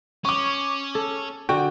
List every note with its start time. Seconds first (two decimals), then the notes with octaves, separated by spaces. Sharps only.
0.25 C#4 C#6 D6
0.95 A4
1.49 D3 F#4 G5